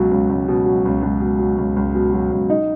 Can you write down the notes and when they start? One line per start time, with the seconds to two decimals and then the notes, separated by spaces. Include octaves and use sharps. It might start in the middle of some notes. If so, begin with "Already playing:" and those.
Already playing: C#2 B2 F#3
0.11 C#2
0.29 C#2
0.48 B2
0.66 F#3
0.85 C#2
1.03 C#2
1.21 B2
1.39 F#3
1.58 C#2
1.76 C#2
1.95 B2
2.13 F#3
2.32 C#2
2.50 D#4